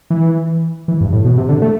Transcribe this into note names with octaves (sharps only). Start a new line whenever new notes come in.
E3
E3
G2
A2
B2
C3
D3
A3